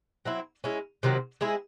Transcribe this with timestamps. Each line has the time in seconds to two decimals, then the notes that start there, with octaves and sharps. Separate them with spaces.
0.25 F#3 C4 E4
0.64 G#3 C#4 E4
1.03 C3 D#3 F#3 C4
1.41 G#3 C4 E4 G#4